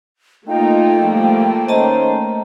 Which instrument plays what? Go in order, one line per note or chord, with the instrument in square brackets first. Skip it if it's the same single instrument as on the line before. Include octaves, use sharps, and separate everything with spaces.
[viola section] A3 A#3 [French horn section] D#4 F4 [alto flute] G5
[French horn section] F3 G3
[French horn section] D#3 C#4 C5 [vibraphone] D#5 A5 A#5